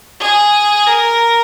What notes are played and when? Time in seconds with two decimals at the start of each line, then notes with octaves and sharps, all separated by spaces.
0.20 G#4
0.87 A#4